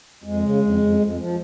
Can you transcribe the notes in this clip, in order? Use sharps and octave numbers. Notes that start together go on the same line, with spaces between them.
F2 G#3
C#3
F2
F2
F2
F3